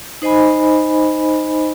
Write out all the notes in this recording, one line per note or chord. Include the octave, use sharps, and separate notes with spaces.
D#4 C5 D#5 G#5 B5